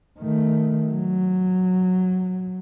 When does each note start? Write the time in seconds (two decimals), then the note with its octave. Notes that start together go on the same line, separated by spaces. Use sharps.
0.19 D#3 A3
0.90 F#3